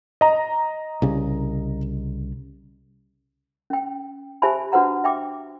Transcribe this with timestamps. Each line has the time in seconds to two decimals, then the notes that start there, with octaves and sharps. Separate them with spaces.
0.21 D#5 A#5
1.02 C2 C#3
3.70 C#4 G5
4.42 G4 C5 E5 G#5 A5 B5
4.72 D4 F#4 B4 C5 F#5 A#5
5.04 E5 G5 D6